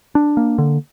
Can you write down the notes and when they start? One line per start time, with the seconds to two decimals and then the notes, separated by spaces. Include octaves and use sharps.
0.15 D4
0.37 A#3
0.58 D3